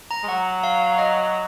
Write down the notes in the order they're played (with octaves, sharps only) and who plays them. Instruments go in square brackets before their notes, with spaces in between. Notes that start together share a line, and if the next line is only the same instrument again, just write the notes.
[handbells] A#5
[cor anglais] G#3
[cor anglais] F#3 [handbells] F#5
[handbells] F5
D#5